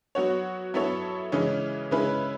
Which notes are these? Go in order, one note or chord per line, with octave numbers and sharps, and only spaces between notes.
F#3 B3 F#4 C#5
F#3 B3 E4 A4 C#5
C#3 E3 G#3 C#4
C#3 G#3 C#4 E4 B4